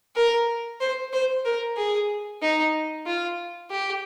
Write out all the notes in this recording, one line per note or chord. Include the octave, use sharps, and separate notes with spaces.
A#4
C5
C5
A#4
G#4
D#4
F4
G4